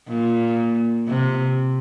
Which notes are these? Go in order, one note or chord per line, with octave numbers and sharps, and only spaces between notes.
A#2
C3